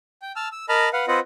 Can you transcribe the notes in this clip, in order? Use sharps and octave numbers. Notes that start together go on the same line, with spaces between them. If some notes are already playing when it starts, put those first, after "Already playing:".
G5
A5 E6 F6
E6
A#4 D#5 A5 B5 F6
B4 F5 F#5
C4 F4 B4 C5 D#5 F#5